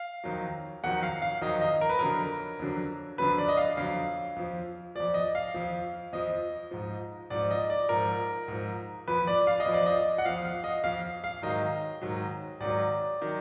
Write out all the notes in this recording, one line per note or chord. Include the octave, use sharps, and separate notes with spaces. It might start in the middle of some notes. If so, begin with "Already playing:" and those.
Already playing: F5
F2 D#3 F#3
F2 D#3 F#3 F#5
F5
F5
F2 D#3 F#3 D#5
D#5
A#4
B4
F2 D3 F#3 A#4
F2 D3 F#3
F2 D3 F#3 B4
D5
D#5
F5
F2 D3 F#3 F5
F2 F3
F2 F3 D5
D#5
F5
F2 F3
F2 F3 D#5
G#2 F3
G#2 F3 D5
D#5
D5
G#2 F3 A#4
G#2 F3
F2 F3 B4
D5
F5
D#5
F2 F3
D5
D#5
F#5
F2 F3 F5
F5
D#5
F2 F3 F5
F5
G#2 D#3 F#3 D#5
G#2 D#3 F#3
G#2 D#3 F#3 D5
D#3 F#3